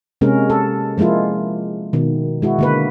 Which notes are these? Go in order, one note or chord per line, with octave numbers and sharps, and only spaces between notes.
C3 G#3 A#3 C#4 A#4
A4
F3 G#3 A#3 E4 F4
B2 D#3
G#3 E4 F#4
D3 A#3 B4